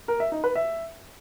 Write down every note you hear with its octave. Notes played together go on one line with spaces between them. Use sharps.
A#4
E5
D#4
B4
E5